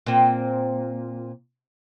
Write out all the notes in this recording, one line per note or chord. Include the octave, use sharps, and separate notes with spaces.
A#2 C4